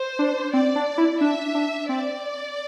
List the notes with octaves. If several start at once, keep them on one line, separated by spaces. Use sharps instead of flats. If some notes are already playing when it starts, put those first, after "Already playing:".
Already playing: C5
D4
C4 D5
D4
E4
D4 E5
D4
C4 D5